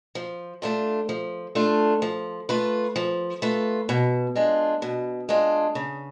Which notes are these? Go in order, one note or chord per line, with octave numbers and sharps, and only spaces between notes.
F3
A3 D4 F4
F3
A3 D4 F4
F3
A3 F4 B4
F3
A3 F4 B4
B2
G#3 D4 F4
B2
G#3 D4 F4
C#3